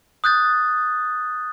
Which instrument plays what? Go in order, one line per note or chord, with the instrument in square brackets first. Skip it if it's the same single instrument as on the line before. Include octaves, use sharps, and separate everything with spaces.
[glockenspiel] D#6 F#6 G6 A6